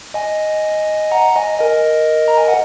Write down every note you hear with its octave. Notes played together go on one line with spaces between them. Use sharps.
D#5 G#5
F#5 A#5
D#5 G#5
A#4 D#5
A#5
G#5
F#5